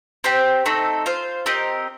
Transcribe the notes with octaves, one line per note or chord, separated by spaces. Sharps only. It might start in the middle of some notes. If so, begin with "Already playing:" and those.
C4 G4 C5 G5
A3 C4 D#4 A4
F4 C5 F5
C4 G4 A#4 D#5